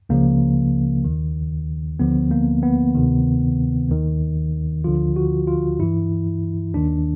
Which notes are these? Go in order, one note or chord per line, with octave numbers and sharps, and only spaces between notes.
C#2 C#3 F3 A#3
D#2 D#3
D2 D3 F3 B3
A#3
B3
D2 C3 D#3
D#2 D#3
D2 D3 F3 F4
F#4
F4
G2 E3 E4
D#2 D#3 D4